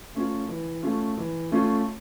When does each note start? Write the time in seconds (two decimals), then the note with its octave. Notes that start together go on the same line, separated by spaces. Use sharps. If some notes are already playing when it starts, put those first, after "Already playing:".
0.15 A3 C#4 F4
0.49 E3
0.83 A3 C#4 F4
1.17 E3
1.51 A3 C#4 F4